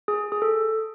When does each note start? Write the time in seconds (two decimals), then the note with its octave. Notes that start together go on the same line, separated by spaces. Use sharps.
0.08 G#4
0.32 G#4
0.42 A4